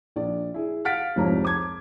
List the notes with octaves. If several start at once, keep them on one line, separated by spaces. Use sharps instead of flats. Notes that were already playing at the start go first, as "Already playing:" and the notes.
A#1 D5
E4 G#4
F5 F#5 F6 A6 B6 D7
C2 F2 G#2 C#5 A#5
A5 D6 G#6